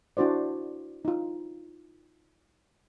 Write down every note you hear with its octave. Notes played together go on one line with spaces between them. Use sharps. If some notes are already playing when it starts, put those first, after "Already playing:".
D4 E4 F#4 C5 D5
D#4 F4